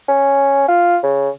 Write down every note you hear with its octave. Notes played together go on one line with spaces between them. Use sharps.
C#4
F4
C#3